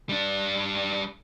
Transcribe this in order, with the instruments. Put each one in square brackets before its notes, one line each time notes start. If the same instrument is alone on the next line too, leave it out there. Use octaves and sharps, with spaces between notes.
[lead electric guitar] G3 D4